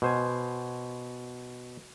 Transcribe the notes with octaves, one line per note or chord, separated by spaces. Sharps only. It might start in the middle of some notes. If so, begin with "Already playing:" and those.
B2 C5 G#5